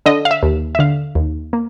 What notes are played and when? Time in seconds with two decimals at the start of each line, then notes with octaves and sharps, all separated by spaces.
0.06 D3 D#5
0.25 F5
0.31 E5
0.43 D#2
0.75 E5
0.79 D3 F5
1.15 D#2
1.53 A#3